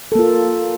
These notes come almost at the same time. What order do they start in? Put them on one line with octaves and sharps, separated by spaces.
A4 A#3 F4